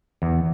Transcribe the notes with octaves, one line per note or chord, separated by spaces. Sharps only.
E2